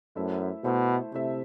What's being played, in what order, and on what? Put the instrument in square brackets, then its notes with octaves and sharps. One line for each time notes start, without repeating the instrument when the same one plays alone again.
[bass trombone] F#2 [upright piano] A3 E4 A4 C5 E5
[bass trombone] B2 [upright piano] A3 E4 A4 C5 E5
[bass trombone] C3 [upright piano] A3 E4 A4 C5 E5